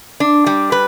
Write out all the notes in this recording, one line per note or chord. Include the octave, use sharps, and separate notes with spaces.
D4
G3
B4